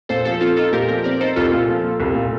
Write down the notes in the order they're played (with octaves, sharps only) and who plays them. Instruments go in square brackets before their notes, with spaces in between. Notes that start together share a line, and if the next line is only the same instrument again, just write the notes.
[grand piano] A#2 [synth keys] A4 C5
[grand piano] F3 [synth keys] A4 C5
[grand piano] C4 [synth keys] F4 A4
[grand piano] D#4 [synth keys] F4 A4
[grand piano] A#2 [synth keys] G4 A#4
[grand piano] F3 [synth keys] G4 A#4
[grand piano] C4 [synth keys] A#4 D5
[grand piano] D#4 [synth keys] A4 C5
[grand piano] C2 [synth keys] F4 A4
[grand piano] A#2
F3
A#3
C2
A#2